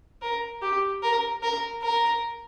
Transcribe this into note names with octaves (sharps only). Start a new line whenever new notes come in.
A#4
G4
A#4
A#4
A#4